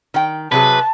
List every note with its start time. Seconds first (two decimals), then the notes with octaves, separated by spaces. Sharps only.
0.14 D#3 G5
0.52 C3 F#3 G#4 B4 A5